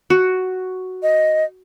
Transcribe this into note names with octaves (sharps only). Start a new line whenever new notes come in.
F#4
D#5